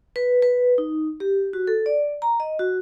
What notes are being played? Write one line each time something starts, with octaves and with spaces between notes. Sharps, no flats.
B4
B4
D#4
G4
F#4
A4
D5
A#5
D#5
F#4